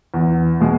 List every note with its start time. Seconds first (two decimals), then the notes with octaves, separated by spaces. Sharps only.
0.14 E2
0.60 B2 G#3